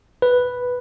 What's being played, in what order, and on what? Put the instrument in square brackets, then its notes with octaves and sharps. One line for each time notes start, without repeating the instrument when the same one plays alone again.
[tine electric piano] B4